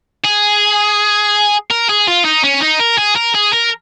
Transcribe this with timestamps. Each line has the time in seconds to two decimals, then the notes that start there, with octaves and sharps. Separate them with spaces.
0.24 G#4
1.70 A#4
1.89 G#4
2.07 F4
2.25 D#4
2.44 C#4
2.61 D#4
2.80 A#4
2.98 G#4
3.16 A#4
3.35 G#4
3.53 A#4